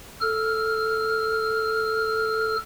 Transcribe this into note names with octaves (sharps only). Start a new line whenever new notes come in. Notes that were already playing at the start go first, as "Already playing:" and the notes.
A4 F6